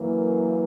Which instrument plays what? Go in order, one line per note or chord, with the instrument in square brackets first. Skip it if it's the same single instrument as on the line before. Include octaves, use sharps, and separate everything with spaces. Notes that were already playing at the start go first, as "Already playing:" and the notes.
Already playing: [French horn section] F#2 E3 A#3